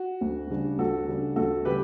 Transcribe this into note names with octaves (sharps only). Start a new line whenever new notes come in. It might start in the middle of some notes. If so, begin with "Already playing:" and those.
Already playing: F#4
D2
C#3 G3 D4
D2 F#4 A4
C#3 G3 D4
D2 F#4 A4
C#3 G3 G4 B4